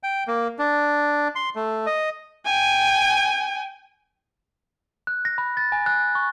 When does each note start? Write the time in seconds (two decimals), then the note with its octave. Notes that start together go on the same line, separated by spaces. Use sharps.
0.03 G5
0.28 A#3
0.59 D4
1.35 C6
1.56 A3
1.86 D#5
2.46 G5 G#5
5.07 F#6
5.25 A#6
5.38 B5
5.57 A6
5.72 G#5
5.86 F#6
6.15 C#6